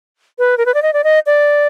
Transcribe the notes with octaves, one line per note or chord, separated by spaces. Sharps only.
B4
A#4
B4
D5
D#5
D5
D#5
D5